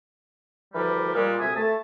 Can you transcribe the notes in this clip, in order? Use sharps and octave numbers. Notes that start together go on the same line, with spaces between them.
D2 E3 F3 G3 A#4 B4
A#2 G3 G#3
D2 C3 E5 G#5 D#6
A3 A5